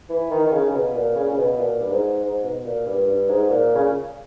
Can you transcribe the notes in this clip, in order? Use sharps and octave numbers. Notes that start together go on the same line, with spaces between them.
E3
D#3
D#3
C#3
C#3
B2
A#2
C#3
C#3
B2
A#2
G2
G#2
G#2
B2
A#2
G2
G2
G#2
A#2
C#3